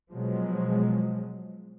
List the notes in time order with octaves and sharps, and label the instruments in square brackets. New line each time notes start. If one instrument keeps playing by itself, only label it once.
[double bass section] B2 F3 F#3 G#3